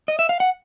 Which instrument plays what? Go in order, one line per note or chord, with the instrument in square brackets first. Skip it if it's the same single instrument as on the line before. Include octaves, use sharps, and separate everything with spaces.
[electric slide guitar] D#5
E5
F5
F#5